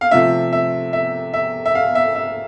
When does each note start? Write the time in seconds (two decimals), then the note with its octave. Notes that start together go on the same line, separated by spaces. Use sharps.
0.01 F5
0.11 C3 F3 A3 E5
0.53 E5
0.93 E5
1.34 E5
1.66 E5
1.75 F5
1.95 E5
2.16 E5